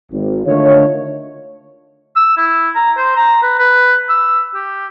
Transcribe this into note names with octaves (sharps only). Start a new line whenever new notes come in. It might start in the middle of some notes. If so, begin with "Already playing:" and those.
G#1
D3 D#3 A3 F4 C#5
E6
E4
A#5
C5
A#5
B4
B4
E6
G4